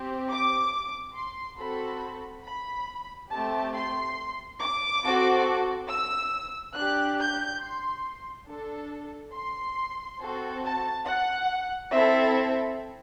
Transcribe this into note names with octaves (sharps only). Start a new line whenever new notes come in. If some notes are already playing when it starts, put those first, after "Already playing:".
Already playing: C4 G4
D6
C6
C4 F#4 A4 B5
B5
A3 C4 G4 A5
C6
D6
C4 F#4 A4
E6
D4 G4 F#6
G6
C6
D4 A4
C6
C4 F#4 A4
A5
F#5
C4 E4 A4 E5